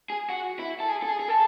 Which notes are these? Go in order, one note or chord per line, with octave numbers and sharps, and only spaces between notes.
G#4
F#4
E4
A4
G#4
A4
G#4
G#4
A4